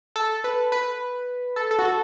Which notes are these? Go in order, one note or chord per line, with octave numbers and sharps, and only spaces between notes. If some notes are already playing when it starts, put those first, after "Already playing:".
A4
B4
B4
A4
A4
F#4
A4